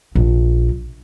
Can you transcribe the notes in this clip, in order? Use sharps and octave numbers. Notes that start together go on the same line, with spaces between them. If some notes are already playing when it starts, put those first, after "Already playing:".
A#1